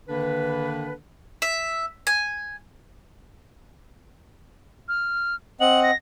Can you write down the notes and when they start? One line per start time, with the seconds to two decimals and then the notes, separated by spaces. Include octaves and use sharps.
0.08 D3 D#3 A#3 D4 B4
1.42 E5
2.07 G#5
4.88 F6
5.61 C4 D#5 F#5 F#7
5.83 A#6